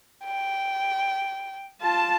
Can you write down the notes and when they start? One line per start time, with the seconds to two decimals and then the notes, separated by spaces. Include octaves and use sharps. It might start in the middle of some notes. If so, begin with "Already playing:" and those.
0.24 G5
1.83 F4 A5